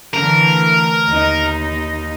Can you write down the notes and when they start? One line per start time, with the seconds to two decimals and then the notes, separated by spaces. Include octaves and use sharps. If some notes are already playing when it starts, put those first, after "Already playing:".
0.13 D3 E3 A3 A#4
1.09 D#2 D#4